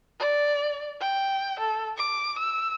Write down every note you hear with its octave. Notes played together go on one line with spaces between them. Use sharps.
D5
G5
A4
D6
E6